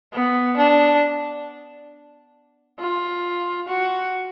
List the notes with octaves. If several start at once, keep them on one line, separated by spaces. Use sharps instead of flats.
B3
D4
F4
F#4